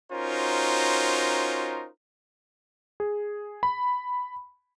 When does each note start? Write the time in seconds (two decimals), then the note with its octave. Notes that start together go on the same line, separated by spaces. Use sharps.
0.12 C#4 D#4 F4 F#4 A#4 C5
3.00 G#4
3.63 B5